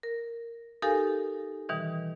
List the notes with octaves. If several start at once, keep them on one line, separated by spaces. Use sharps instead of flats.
A#4
D#4 G4 A4 A#4 F5 G#5
B2 D#3 E3 G3